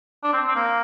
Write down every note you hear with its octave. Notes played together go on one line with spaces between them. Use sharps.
D4
C4
C4
A#3